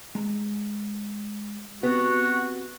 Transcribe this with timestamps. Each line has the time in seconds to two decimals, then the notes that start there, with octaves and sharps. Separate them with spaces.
0.15 G#3 A#5
1.83 B3 C4 F#4 G4